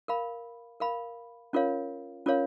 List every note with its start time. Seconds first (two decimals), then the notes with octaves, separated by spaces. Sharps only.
0.08 A#4 F5 B5
0.80 A#4 F5 B5
1.53 C#4 F4 A#4 C#5 F5
2.26 C#4 F4 A#4 C#5 F5